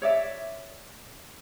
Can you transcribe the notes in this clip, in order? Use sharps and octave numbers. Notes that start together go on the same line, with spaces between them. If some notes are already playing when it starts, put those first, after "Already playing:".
C#5 D5 E5